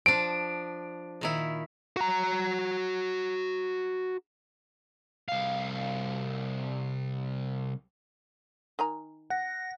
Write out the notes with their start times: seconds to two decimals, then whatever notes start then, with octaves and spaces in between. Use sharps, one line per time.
0.06 F3 D4 D7
1.21 A#2 D#3 E4
1.96 F#4 A#5
5.29 C2 F5
8.79 D#3 G#5 A#5
9.30 F#5 A#6